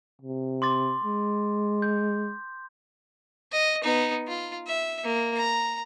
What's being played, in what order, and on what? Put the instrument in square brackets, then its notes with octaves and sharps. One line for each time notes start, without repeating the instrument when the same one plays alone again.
[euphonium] C3
[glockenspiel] C6 D6 A6
[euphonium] G#3
[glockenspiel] G6
[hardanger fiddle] D#5
B3 D#4
F4
E5
A#3
A#5